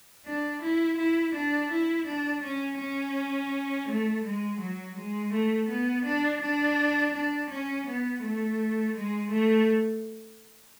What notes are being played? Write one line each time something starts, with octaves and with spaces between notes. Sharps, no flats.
D4
E4
E4
D4
E4
D4
C#4
C#4
A3
G#3
F#3
G#3
A3
B3
D4
D4
D4
C#4
B3
A3
G#3
A3